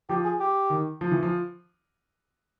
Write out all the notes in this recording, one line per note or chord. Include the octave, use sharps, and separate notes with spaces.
F3 G4
G#4
G4
D#3
F3
E3
F3